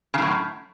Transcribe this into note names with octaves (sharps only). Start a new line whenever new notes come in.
F#2 A2 C#3